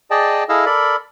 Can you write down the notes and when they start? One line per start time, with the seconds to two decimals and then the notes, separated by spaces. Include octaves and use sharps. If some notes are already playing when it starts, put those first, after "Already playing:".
0.11 G#4 D5 D#5 G5 A5
0.49 E4 G#4 A4 D#5 F5 E6
0.66 A4 A#4 D5 B5